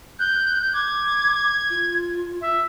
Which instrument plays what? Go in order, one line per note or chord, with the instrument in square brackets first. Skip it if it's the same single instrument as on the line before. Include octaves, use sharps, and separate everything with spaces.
[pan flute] F#6 [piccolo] G6
[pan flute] D6 [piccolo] G#6
[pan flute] F4
[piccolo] E5